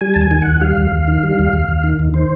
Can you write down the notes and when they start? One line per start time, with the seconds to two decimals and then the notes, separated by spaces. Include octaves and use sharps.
0.01 G3 G#5
0.14 D#2 A5
0.21 G#5
0.31 D#3
0.42 F#5
0.47 D#2
0.61 G3 F5
0.77 D#2
0.92 D#2
1.08 D#3
1.23 G3
1.39 D#2
1.53 D#2
1.68 D#2
1.83 D#3
1.99 D#2
2.14 D#3 C5